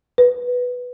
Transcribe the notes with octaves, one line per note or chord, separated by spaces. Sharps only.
B4